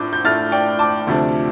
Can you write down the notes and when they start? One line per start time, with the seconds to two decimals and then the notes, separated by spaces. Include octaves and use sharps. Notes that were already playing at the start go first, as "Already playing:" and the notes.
Already playing: A2 A3 D4 D6 G6
0.13 G6
0.24 A2 A3 D4 F6 A6
0.52 D5 G5
0.79 A5 D6
1.07 D2 C3 F3 A3 D4